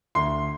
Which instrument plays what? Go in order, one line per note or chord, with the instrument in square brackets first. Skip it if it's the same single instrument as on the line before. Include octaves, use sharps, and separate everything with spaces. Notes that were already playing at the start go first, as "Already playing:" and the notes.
[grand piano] D2 C6